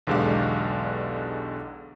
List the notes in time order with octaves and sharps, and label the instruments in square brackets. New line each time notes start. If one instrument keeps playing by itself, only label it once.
[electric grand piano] B1 E2 D3 G#3 G4 F5